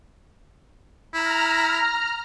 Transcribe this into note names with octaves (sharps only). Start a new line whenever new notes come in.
E4 A#5 F6